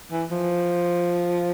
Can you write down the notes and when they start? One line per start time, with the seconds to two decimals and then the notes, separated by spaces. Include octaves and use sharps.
0.12 E3
0.31 F3